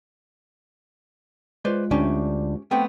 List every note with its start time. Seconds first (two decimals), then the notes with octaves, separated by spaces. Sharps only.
1.65 G#3 F4 B4 C5 D5
1.91 D2 C#4 D4 G4
2.71 A3 B3 C4 G5